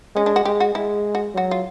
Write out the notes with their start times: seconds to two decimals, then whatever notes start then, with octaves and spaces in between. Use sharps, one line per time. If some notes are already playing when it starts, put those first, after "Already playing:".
0.16 G#3 C#4
0.26 D4
0.36 F#4
0.45 G#3 G4
0.60 F#4
0.75 G#3 E4
1.15 F#4
1.35 F#3 F#4
1.51 F4